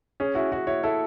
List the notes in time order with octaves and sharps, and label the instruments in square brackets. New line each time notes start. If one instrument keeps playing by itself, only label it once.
[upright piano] C#4 [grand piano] G#4
[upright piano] E4 [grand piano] F#4
[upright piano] E4 [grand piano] F#4
[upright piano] E4 [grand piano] C#5
[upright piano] E4 [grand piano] A4